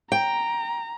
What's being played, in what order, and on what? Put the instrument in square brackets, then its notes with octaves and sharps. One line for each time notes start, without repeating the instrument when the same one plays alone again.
[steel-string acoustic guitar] G5 [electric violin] A#5